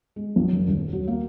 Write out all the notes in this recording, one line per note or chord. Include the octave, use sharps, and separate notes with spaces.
G#3
B1
F#1
D#1
F#3
A#3